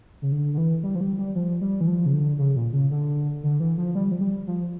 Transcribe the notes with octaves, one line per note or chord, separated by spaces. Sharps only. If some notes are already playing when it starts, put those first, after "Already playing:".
C#3
D3
D3
E3
G3
F3
G3
G3
F3
G3
E3
F3
C#3
D3
C#3
A#2
C#3
D3
D3
E3
F3
G3
F3
G3
F3